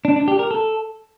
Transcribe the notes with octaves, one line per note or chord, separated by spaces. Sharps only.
D4
D4
G4
A#4
A4